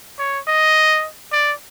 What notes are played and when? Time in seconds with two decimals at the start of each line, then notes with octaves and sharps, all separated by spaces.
0.19 C#5
0.48 D#5
1.33 D5